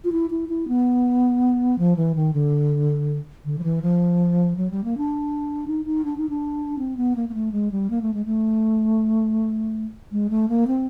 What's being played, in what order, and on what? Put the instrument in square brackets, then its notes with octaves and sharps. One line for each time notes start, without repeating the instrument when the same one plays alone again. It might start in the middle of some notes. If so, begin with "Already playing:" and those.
[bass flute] F4
E4
E4
E4
B3
F3
E3
D#3
D3
D3
F3
E3
F3
F#3
G3
A#3
D4
D#4
D#4
D4
D#4
D4
C4
B3
A#3
A#3
A3
G#3
G3
A#3
A3
G#3
A3
G#3
A3
A#3
C4